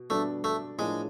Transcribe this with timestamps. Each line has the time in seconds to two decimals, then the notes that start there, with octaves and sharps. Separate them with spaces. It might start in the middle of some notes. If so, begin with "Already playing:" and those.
Already playing: B2
0.10 B2 G3 A3 B3 D4
0.44 A3
0.78 A2 F3 G#3 A#3 D4